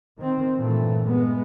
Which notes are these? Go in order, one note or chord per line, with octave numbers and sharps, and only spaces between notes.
D#3 C4
G2 A#2 E3 A3
G#3 B3